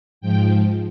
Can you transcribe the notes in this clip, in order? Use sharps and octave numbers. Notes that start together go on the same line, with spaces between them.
G#2 F3 G5